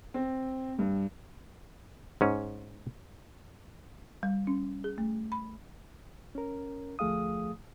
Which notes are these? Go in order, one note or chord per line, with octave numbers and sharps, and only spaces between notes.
C4
G2
G#2 C#4
G3
C#4
G#4
A3
B5
C#4 A#4
D2 F3 A3 G#4 F5 D#6